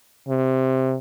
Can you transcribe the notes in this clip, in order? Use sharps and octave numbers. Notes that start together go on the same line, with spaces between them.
C3